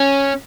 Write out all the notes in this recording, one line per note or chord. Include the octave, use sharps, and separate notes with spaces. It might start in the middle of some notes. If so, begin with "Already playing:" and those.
Already playing: C#4